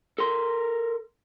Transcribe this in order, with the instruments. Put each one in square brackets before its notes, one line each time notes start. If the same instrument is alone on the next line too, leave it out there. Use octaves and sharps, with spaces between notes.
[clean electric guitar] A4 A#4 C6